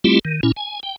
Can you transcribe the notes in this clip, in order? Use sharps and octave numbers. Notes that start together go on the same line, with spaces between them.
G3 A3 C4 E4 F4 G4
D#3
A#2 C#4 E4
G#5
G5